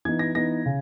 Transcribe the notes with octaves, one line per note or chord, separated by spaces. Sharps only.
E3 B3 D#4 G#6
A#6
E3 B3 D#4 A#6
C#3